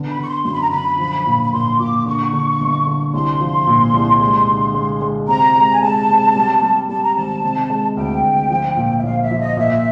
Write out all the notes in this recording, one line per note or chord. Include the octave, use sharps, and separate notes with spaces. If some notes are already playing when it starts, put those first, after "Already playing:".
Already playing: D3 B3
B5
D3 C#6
C6
F#2 C6
B5
A#5
D3 B5
F3
A#2
B5
A#2 C6
A#2 D6
D3 C#6
D3
G1
D3
C2 C6
F3
A#2
C2
G#3
D3
G#3
G#3
C3 A#5
G#3
G#5
G#3 A5
C3
G3
G3
G3 A5
A#5
G#1 A5
C3
G#3
D2 G5
D2
F3
A#2
E5
A#1 F5
E5
F3
D#5
A#2 E5